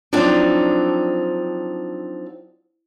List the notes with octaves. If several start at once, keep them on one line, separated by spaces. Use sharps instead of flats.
F3 F#3 C4 D4 D#4